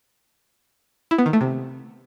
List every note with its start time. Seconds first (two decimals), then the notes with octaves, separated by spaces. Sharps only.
1.11 E4
1.18 B3
1.26 D#3
1.33 A3
1.41 C3